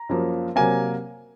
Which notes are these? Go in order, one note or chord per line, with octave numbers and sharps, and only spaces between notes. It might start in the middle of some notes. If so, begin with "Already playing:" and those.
Already playing: A#5
F#2 F3 A#3
C3 F#3 A#3 G#5